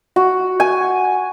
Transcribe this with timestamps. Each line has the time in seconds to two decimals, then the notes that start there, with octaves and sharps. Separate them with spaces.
0.16 F#4
0.60 G#5